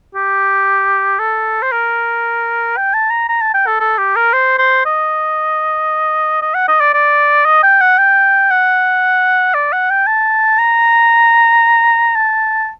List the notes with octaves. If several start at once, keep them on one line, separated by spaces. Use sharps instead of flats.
G4
A4
C5
A#4
G5
A5
A#5
A#5
A5
G5
A4
A4
G4
A#4
C5
C5
D#5
D#5
F#5
D#5
D5
D5
D#5
G5
F#5
G5
F#5
D5
F#5
G5
A5
A#5
A5